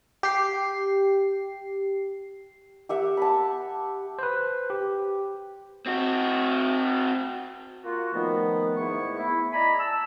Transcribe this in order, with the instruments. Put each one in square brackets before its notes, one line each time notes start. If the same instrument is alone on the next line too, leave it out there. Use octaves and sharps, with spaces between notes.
[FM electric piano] G4 C7
[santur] G4 E5 F#5
A5 B5
[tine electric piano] B4 C5
G4
[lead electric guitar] C4 F#4
[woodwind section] A#3 F4 F#4
A#2 D#3 F3 A3 B3
E2 G#2 A3 B3 E4 C#6
E4
D5 D#5 G#5 A#5 B5
A5 E6